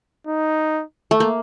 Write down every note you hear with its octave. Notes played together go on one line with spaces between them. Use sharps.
D#4
A3
A#3